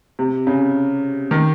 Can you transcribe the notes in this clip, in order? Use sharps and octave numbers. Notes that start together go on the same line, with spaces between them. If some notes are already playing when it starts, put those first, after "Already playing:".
C3
C#3
D#3